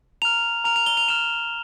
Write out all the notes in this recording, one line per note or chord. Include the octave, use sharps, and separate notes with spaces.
A#5 F6 F7
A#5 F6 F7
F7
G7
F7
A#5 F6 E7